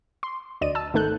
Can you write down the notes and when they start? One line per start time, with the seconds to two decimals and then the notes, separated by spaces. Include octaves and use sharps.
0.23 C6
0.61 D2 D5 D#5 D#7
0.75 A5 E6
0.93 G#1 D#3 A3 A4 F#6 G6